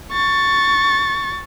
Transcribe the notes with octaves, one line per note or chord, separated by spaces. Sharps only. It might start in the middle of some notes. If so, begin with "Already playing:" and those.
C#6 A6